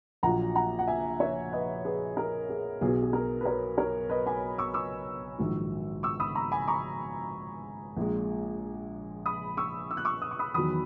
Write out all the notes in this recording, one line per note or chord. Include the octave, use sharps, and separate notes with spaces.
A#1 A#2 F#3 F#5 A#5
F#5 A#5
F#5
E5 G#5
C#5 E5
B4 D#5
G#4 B4
A#4
G#4
B1 B2 F#3 G#4
G#4
A#4
B4
A#4 C#5
A#4 C#5
B4 D#5
G#5 B5
C#6 E6
C#6 E6
A#1 G#2 D#3 F#3
C#6 E6
B5 D#6
A#5 C#6
G#5 B5
A#5 C#6
A#1 A#2 G#3
B5 D#6
C#6 E6
E6
F#6
C#6 E6
D#6
C#6
B5 D#6
E2 D#3 F#3 B5 D#6